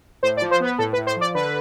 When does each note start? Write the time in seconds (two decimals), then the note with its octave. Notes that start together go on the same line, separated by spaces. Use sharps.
0.23 A2 C5
0.37 D5
0.42 F3
0.51 C5
0.60 B3 B4
0.78 A2 A4
0.93 B4
0.97 A2
1.07 C5
1.16 F3 D5
1.35 D3 B4